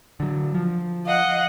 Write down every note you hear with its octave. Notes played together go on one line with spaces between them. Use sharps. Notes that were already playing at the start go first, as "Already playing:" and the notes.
D3 F#3
F3
D#5 F5 F#5